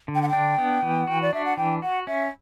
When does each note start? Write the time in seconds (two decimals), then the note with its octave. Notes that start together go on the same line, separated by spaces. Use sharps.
0.08 D3
0.15 G5
0.22 F#5
0.29 D4 G5
0.58 B3
0.82 E3
1.07 F#4
1.22 D5
1.33 D4 E5
1.45 F#5
1.57 E3 G5
1.82 F#4 F#5
2.07 C#4 E5